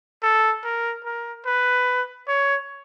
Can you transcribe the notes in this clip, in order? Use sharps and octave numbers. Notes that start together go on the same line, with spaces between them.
A4
A#4
A#4
B4
C#5